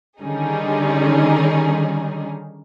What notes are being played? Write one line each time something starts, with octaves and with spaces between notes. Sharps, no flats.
D3 D#3 G3 C#4 D#4 G#4